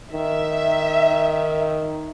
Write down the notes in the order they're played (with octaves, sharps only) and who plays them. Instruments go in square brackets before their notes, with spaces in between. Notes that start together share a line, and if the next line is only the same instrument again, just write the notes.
[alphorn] D#3 [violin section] E5